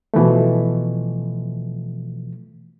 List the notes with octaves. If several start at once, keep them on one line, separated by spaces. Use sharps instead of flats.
B2 E3 F3 A3